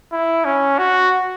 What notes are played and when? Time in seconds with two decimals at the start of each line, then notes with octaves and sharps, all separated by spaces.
0.12 E4
0.45 C#4
0.78 F#4